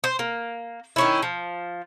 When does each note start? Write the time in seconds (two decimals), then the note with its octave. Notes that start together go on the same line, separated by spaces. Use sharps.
0.04 C5
0.19 A#3
0.96 D#3 C#4 E4
1.22 F3